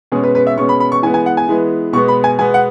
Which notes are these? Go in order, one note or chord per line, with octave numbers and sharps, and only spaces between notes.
B2 G#3 C#4 G#4
B4
B4
E5
B2 G#3 C#4 C#6
B5
B5
C#6
E3 G#3 B3 G#5
G#5
F#5
G#5
E3 G#3 B3
B2 G#3 B3 C#6
B5
G#5
B2 G#3 B3 G#5
F#5